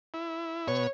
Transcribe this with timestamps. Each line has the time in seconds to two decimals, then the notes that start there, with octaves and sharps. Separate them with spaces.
0.14 E4
0.68 B2 C#5